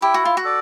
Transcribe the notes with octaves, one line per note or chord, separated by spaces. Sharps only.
E4 G4
F#4
F4
F#4
A4 D5